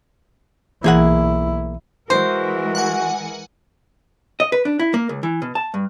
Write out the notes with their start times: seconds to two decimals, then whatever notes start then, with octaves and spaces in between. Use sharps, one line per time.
0.84 B1 E3 A#3 E4 G#4 F#5
2.10 E3 G#3 F#4 A#4 C5
2.75 F#5 G#5
4.40 D#5
4.52 B4
4.65 D4
4.79 E4
4.94 A#3
5.09 C#2
5.23 E3
5.42 B2
5.55 A5
5.74 G2